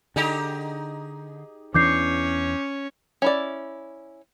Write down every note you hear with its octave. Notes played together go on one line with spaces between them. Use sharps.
D3 D#4 G4 G#4
E2 E3 C#4 D4 C#5 D6 G6 C7
C#4 E4 D5